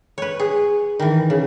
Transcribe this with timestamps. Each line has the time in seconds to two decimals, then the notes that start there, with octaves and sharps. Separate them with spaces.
0.18 B4 C#5
0.39 G#4
0.99 D#3 E3
1.30 C#3